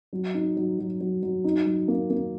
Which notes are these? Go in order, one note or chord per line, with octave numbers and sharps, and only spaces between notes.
F#3
D#4
F#3
F#3
F#3
F#3
D#4
F#3
A#3
A#3